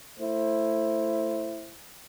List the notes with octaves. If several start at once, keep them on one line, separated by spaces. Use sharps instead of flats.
A3 E4 C5